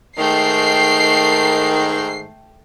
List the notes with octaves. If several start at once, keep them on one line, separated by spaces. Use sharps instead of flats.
G#2 D#3 A3 G5 C7